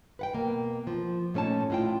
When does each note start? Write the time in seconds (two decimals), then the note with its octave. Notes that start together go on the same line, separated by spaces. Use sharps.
0.19 B4 F#5 G5
0.33 B2 A#3
0.87 F3
1.34 A#2 A3 C#4 D#4 A5
1.70 A2 F4 G5